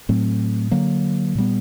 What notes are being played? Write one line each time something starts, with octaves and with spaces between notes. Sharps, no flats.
A2 F#3 A3 C4
D3 F#3 A#3
A#2 G3 B3